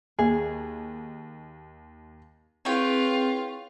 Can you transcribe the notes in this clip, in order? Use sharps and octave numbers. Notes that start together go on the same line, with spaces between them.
D#2 G#4
C4 E4 F4 G#4 B4 C#5 G5